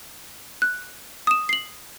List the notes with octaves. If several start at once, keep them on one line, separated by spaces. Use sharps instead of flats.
F#6
D#6 E7
C7 F#7